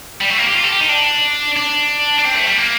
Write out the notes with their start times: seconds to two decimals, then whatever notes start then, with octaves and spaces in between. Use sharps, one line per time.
0.21 G3
0.30 A3
0.38 A#3
0.47 G4
0.55 F4
0.64 A4
0.72 G4
0.81 D#4
0.89 D4
1.56 D4
2.19 D4
2.25 C4
2.35 A3
2.47 G3
2.58 A#3